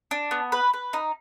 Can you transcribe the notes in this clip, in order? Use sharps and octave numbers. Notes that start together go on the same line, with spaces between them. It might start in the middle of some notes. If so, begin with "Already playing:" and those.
D4
B3
B4
B4
D#4